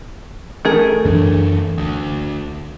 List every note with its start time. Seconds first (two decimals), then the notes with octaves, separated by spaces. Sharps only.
0.65 A3 G#4 A#4
1.05 F#2 E3 D4
1.78 D2